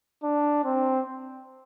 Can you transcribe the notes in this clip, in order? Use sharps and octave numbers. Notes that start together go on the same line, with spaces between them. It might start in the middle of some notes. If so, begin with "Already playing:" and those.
D4
C4